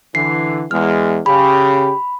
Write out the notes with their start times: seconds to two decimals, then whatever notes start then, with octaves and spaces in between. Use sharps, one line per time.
0.15 D3 E3 C7
0.71 E2 G#3 F6
1.26 C#3 G4 B5